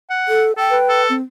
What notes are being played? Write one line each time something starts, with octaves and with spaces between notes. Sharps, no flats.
F#5
A4
A4 G5
B4
A4
C4